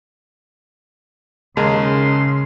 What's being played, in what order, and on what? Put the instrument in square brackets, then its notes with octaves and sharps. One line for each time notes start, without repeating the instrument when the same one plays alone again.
[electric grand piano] D#2 G#3 A#4 [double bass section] C#3 [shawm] C6